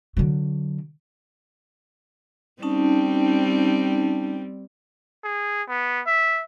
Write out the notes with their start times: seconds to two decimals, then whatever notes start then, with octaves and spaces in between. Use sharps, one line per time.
0.17 D3 F#3
2.62 G3 C4 C#4 D#4 A5
5.24 G#4
5.69 B3
6.06 E5